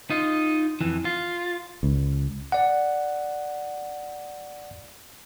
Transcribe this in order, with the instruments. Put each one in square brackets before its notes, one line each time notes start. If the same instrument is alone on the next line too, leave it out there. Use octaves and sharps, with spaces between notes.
[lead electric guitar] D#4 F4
F2 E3
F4
[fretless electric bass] C#2
[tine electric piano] D5 F#5